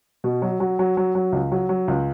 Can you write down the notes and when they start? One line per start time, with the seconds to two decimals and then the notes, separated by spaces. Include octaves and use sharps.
0.24 B2
0.42 F#3
0.60 F#3
0.79 F#3
0.97 F#3
1.15 F#3
1.32 C#2
1.52 F#3
1.69 F#3
1.88 C#2